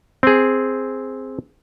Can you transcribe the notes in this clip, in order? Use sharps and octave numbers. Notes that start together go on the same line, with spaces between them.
C4 G#4